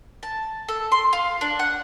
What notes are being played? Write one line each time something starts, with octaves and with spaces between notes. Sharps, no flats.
A5
A4
C6
F4
D4
F#5